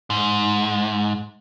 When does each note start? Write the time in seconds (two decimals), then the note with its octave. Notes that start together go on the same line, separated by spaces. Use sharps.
0.10 G#2